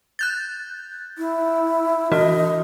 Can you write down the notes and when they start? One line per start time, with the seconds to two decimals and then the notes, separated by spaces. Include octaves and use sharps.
0.19 F#6 G6 A6
1.18 E4
2.12 E3 F#4 D#5